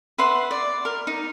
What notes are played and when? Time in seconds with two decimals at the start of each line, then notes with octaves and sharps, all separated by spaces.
0.18 B4 E5 F#5 C6
0.51 D5
0.85 A#4
1.07 D#4